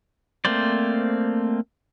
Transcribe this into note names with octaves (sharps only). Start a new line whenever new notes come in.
A3 A#3 C4 C5 D5